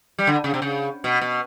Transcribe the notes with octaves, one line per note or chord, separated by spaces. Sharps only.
G3
D3
C#3
C3
C#3
B2
B2